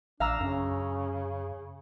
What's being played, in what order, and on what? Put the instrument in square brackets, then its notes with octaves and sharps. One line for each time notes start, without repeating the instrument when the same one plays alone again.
[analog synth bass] A#1 [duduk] D4 [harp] F5 A#5 E6
[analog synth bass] F#2 [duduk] C#3 [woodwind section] C#4